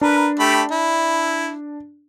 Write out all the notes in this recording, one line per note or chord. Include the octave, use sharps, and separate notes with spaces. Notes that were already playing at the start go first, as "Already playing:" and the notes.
D4 A#4 B4
A3 G4 B5
E4